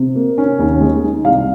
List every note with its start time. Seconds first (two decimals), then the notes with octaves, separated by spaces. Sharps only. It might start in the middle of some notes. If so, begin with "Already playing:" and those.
Already playing: C3
0.15 A#3
0.38 C#4
0.59 D#2
0.81 G#3
1.04 D#4
1.25 C2 F5